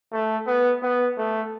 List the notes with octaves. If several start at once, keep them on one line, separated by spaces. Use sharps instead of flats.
A3
B3
B3
A3